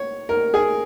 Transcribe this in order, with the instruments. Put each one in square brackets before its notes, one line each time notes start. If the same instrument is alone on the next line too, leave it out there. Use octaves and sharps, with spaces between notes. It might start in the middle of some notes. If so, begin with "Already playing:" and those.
Already playing: [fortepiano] C#5
A#4
G#4